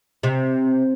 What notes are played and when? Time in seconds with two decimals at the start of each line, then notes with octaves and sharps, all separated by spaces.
0.23 C3